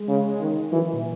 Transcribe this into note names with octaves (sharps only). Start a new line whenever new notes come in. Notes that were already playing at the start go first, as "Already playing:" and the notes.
Already playing: G#3
C#3
D#3
E3 F#3
D#3
A#2